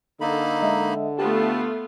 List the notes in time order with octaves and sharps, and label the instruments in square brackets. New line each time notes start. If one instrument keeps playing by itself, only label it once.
[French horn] D3 [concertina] A#3 D#4 B5 [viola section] A4
[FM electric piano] G#3 D#5 E5
[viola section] A3 B3 F4 [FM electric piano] G4 [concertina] A5